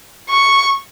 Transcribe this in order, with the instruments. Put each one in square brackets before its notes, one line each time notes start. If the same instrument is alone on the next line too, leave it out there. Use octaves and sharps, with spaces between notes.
[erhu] C#6